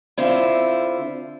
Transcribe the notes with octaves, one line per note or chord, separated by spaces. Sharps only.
D3 C4 E4 F4